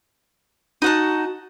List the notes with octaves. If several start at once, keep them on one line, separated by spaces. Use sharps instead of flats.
D#4 F#4 F#5 A5